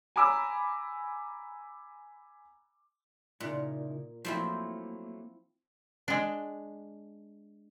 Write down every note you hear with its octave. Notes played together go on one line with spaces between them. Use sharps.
G#5 A#5 B5 D6 E6
A#2 C#3 D#4 E4
F3 F#3 A3 A#3 C4 E4
G#3 D4